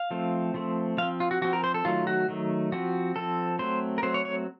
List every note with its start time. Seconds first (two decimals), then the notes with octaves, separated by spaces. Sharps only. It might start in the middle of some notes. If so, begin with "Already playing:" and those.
Already playing: F5
0.11 F3 A3 C4
0.54 F3 A3 C4
0.98 F3 C4 F5
1.20 F4
1.31 F#4
1.42 F3 C4 F#4
1.53 A#4
1.64 C5
1.74 A4
1.85 D#3 F#3 A3 F4
2.07 F#4
2.29 D#3 F#3 A3
2.72 F3 C4 F#4
3.16 F3 C4 A4
3.59 F#3 A3 C4 C5
3.98 A#4
4.03 F#3 A3 C4 C5
4.14 C#5
4.25 C#5